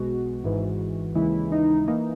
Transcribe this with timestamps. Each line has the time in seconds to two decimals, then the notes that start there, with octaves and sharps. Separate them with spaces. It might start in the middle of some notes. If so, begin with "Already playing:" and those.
Already playing: B1 B2 G#3 B3 F#4
0.43 G#1 G#2 E3
1.15 D#2 C#3 E3 G#3 E4
1.52 D#4
1.87 E3 A#3 D#4